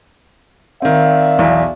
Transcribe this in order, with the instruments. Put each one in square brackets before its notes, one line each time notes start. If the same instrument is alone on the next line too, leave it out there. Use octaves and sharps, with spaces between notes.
[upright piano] D#3 C4 [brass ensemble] D5 E5 F5
[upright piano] B1 E2